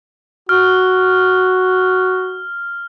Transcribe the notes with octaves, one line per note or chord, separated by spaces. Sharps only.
F#4 F6